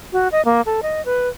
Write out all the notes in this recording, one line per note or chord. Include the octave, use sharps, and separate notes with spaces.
F#4
D#5
A#3
A4
D#5
B4